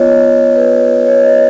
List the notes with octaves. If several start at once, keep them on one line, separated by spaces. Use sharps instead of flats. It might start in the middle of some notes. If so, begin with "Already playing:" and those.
Already playing: B3 F4 C#5 D#5
B4
C#5
D#5